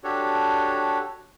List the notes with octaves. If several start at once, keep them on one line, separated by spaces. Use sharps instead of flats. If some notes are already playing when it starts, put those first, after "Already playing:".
D4 F#4 G4 A4 C#5